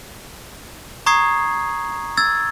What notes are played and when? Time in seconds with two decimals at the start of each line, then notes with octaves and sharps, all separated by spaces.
1.06 A#5 C#6 D#6 G#6 C7
2.17 E6 G#6 A6